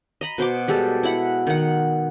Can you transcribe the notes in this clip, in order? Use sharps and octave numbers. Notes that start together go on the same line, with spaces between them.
D#5 A#5 B5
B2 C5 C6 D6
G3 G#3 G4 A4
E4 E5 F#5
D#3 F#5